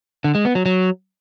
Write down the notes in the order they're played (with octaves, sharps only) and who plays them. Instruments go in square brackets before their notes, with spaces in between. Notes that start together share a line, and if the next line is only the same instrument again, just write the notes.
[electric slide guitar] D3
G#3
B3
F#3
F#3